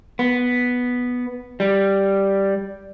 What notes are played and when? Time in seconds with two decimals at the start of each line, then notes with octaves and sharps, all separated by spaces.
0.19 B3
1.60 G3